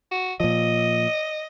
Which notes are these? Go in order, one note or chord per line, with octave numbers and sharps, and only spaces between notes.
F#4
A#2 F3 D#5